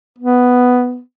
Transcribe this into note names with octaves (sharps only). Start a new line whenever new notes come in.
B3